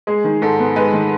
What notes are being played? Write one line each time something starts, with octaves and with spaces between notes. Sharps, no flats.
G#3 G#4
D#3
G#2 A4
B3
G#3 B4
D#3